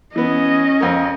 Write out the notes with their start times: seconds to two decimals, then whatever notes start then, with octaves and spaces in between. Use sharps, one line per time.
0.16 E3 B3 C#4 D#5
0.81 F2 A#4